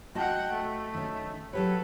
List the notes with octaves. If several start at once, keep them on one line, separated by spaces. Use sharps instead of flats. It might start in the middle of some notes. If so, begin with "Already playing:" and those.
F#4 D#5 F#5 G5 A5
A3
D#3 C#4
F#3 G4 A4 B4 C#5